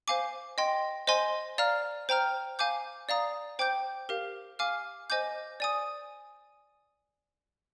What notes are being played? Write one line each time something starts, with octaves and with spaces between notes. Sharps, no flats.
C5 F5 G#5 D6
D#5 G5 C6
C5 D#5 G#5 C6
D5 F5 A#5 F6
C5 G5 A#5 F6
F5 G#5 D6 G6
D5 F5 A#5 D#6
C5 G5 D6 G6
G4 A#4 F5
F5 G#5 D6 F6
C5 D#5 G#5 D6 G6
D5 G#5 D#6